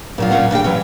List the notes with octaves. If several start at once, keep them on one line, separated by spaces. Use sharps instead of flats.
A#2 F#3 F4
A#2 D#3 C#4 F4 F#5
A#2 C#3 G4 G5
E3 F#3 C#4